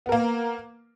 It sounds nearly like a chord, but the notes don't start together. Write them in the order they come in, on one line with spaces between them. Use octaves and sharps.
B3 A#4 A#3